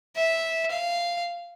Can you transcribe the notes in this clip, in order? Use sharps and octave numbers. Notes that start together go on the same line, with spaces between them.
E5
F5